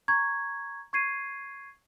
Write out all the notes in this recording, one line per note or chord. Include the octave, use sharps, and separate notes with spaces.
A#5 C#6 G#6
C#6 G#6 C7 D#7